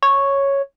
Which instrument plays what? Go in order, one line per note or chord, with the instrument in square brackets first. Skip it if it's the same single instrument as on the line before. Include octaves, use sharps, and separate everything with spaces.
[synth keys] C#5